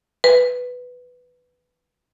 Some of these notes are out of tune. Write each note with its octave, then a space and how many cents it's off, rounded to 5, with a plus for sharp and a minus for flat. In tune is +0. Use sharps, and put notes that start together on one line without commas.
B4 +5